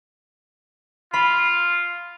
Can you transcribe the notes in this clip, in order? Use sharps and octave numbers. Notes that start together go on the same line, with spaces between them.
F4 B5